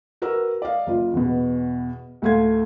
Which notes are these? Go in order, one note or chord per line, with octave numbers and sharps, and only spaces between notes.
F#4 A#4 B4 E6
D5 D#5 F5
F#1 F4
E2 B2
D2 A2 A3 F5 C6 G#6